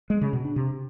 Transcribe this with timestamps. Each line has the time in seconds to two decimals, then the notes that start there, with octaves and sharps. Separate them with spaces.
0.10 G#3
0.21 C#3
0.33 B2
0.45 D4
0.56 C3